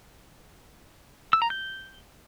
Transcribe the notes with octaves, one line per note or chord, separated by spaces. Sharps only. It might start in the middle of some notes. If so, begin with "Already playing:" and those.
E6
A#5
G6